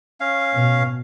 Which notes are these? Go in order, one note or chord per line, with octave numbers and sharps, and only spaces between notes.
C#4 F5
B2